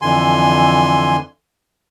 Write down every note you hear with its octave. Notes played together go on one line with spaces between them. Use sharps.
F2 D3 E3 G#5 C6